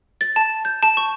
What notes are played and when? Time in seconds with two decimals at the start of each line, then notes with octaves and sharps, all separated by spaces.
0.21 A6
0.36 A5
0.65 G6
0.83 A5
0.97 C#6